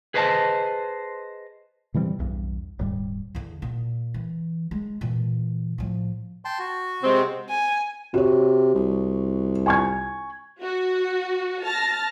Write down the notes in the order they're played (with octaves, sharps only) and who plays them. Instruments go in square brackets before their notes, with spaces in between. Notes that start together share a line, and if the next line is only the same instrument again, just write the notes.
[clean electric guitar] G#4 B4 C5 D#5 F5 A5
[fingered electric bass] B2 E3 G3 C4
B1 E2 G2
D#1 G#2 G3
[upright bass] E2 D3
A#2
E3
G#3
A#2 E3
A2 F3
[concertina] G5 A5 C6
F#4
[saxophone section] C3 G#3 C4
[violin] G#5
[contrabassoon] C3 [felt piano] F#4 C#5
[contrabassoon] C2
[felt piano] G#5 C#6 G#6
[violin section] F#4
A5 F6 A6 A#6